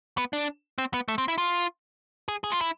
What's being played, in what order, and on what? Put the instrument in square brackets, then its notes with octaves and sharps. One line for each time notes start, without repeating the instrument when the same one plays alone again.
[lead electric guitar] B3
D4
C4
B3
A3
C4
E4
F4
G#4
G#4
F4
E4